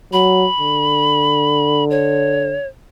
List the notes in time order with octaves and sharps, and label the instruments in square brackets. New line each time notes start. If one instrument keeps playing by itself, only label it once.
[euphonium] F#3 [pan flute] B5
[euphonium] D3
[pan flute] C#5